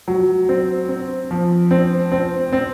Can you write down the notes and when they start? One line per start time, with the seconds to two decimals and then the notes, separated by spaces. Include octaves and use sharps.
0.08 F#3
0.49 C4
0.89 C4
1.31 F3
1.71 C4
2.12 C4
2.53 C4